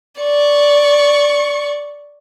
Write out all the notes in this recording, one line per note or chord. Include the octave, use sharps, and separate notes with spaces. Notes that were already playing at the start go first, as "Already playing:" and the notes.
D5 C#6